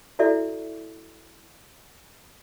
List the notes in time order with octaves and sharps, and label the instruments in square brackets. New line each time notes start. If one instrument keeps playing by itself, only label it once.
[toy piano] E4 F#4 A4 D5 E5